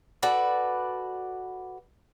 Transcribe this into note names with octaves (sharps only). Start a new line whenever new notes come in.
F#4 A4 B4 D5